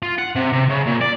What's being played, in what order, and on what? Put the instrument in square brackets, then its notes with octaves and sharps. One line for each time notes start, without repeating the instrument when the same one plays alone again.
[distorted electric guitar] F4
F#5
C3
C3
C#3
A#2
D5